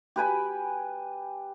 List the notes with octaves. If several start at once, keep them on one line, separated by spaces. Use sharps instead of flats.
G4 B4 G#5 B5